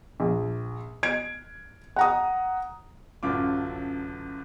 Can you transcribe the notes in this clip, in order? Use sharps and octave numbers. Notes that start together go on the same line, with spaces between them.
A#1
G#6 D7
F#5 A#5 D#6
A1 F#2 D3 F4 D6